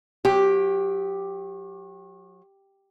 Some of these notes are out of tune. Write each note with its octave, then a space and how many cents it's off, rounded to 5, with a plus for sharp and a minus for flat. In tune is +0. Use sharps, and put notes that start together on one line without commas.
F#3 -35 G4 +0